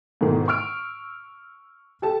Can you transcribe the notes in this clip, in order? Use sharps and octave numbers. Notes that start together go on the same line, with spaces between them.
G#2 B2 D#3 A3 E4
C#6 E6 F6 D7
G4 A4 A5